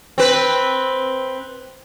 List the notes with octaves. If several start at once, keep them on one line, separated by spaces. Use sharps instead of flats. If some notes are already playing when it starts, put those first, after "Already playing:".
C4 B4